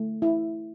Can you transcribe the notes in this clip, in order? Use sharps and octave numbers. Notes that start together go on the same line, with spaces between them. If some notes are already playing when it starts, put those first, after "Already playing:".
Already playing: A3
E4